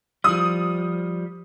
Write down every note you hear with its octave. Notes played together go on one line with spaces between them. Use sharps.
F3 G3 D#6